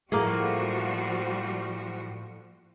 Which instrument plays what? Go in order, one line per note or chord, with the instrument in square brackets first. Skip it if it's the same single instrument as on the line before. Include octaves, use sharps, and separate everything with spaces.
[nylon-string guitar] A2 A3 [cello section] F3 G3 F#4 [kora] A#3 G#4